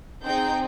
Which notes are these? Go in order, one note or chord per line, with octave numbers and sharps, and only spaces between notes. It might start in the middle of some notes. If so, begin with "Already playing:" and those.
C4 D#4 G#4 G5 G6